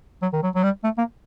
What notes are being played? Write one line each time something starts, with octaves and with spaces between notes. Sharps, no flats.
F#3
D#3
F#3
F#3
G3
A3
A#3